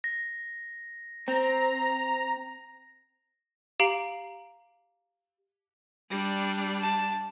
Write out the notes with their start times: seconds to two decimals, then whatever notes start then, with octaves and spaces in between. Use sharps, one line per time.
0.04 A#6
1.28 C4 A#5
3.80 G4 F5 A#5 C7 D7 F#7
6.10 G3 D4
6.80 A5